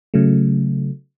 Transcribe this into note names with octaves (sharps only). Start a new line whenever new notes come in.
C#3 F#3 A3